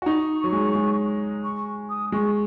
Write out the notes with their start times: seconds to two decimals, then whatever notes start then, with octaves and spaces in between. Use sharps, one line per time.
0.02 F#4
0.06 D#4 C#6
0.44 F#3
0.53 G#3
0.75 G#3
1.44 C#6
1.89 D#6
2.12 G#3 C#6